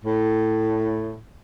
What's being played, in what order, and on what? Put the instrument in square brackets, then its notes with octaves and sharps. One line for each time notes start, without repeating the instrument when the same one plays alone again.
[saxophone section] A2